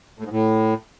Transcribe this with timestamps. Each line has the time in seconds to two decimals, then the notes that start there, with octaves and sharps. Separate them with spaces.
0.19 A2
0.25 G#2
0.31 A2